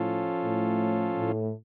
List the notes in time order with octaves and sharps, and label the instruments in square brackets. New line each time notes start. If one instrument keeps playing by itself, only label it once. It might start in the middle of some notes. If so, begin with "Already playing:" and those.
Already playing: [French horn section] A2 [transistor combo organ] F3 C#4 F4 A4
[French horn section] A2
A2